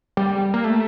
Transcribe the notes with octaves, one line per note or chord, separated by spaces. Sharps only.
G3
A#3
A3